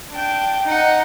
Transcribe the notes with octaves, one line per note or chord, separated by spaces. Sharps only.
D4 G5
D#4 F#5